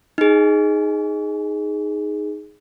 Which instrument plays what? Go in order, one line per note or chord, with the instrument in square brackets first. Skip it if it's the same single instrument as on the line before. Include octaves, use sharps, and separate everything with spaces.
[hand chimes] D#4 G#4